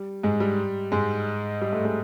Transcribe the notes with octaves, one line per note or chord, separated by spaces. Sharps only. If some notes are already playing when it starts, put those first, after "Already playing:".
Already playing: G3
G#2 G#3
G3
G#2 G#3
G3
A2 A3
G#3